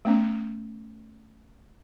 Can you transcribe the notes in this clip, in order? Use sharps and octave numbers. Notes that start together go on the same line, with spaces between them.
A3 B3 C#4